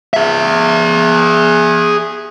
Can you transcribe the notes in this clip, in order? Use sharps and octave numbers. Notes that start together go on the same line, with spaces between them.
G#4 E5